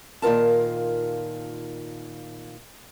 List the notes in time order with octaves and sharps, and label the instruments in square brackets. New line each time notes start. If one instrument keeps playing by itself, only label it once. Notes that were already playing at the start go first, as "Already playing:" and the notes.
[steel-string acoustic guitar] A#2 D#3 F4 A#4 A5